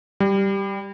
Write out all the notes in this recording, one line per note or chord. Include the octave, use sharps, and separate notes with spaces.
G3